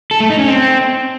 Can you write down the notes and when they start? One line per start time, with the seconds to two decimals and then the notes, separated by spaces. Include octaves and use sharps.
0.11 A4
0.20 A3
0.30 D#4
0.39 C#4
0.48 C4